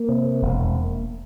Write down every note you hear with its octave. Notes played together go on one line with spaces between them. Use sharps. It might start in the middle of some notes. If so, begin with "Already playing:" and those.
Already playing: A#3
C3
E1